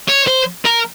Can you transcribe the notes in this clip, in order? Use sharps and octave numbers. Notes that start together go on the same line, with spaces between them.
C#5
C5
A#4